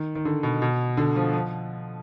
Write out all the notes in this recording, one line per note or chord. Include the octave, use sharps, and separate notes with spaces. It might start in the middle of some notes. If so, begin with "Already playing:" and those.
Already playing: D#3
D#3
D3
B2
B2
D3
F3
F3